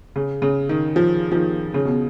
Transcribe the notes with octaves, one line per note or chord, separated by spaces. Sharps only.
C#3
C#3
D#3
F3
F3
D#3
C#3
B2